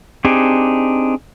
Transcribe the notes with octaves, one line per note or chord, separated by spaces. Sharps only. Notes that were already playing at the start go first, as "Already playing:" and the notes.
C4 D4 D#4 G4 G#4